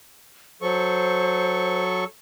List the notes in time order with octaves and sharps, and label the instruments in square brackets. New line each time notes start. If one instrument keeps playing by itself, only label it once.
[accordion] F#3 A4 C#6 [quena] C5